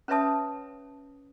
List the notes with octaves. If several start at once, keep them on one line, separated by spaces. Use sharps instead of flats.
C#4 B4 C#5 E5 A5 D#6